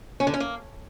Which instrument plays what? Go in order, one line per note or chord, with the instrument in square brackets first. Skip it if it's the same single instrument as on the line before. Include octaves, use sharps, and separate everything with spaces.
[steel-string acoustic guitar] C#4
D3
C#4
A#3